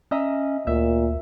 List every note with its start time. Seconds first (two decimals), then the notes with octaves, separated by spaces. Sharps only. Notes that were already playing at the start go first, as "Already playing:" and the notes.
0.11 C#4 D#5 E5 A#5
0.67 D2 A#2 E5